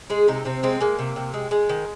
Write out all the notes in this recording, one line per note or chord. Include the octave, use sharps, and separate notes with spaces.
G#3 G#4
C3 D#4
C3 C4
G#3 C4
G#3 A#3
C3
C3
G#3
G#3
D#3